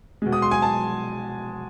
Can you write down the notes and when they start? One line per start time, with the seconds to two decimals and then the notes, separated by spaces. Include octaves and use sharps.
0.22 B2 G#3
0.32 D#6
0.42 C6
0.51 G#5
0.62 A5